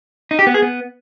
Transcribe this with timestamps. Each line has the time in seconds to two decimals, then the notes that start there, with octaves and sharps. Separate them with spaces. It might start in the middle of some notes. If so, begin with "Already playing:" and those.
0.31 D#4
0.39 G4
0.47 B3
0.54 G#4
0.62 B3